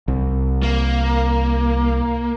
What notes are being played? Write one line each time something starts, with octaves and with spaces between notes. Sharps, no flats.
C2
A#3